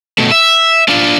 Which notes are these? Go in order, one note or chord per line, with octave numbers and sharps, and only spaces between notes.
B2 A3
E5
D4 F4